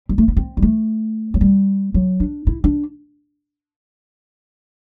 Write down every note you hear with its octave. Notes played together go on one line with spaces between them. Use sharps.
G3
A3
B3
C4
G3
A3
F#3
G3
F#3
D4
E4
D4